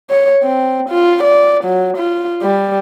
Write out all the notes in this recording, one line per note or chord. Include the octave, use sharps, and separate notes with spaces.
C#5
C4
F4
D5
F#3
F4
G3